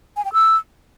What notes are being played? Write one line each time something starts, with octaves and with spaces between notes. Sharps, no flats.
G#5
G5
E6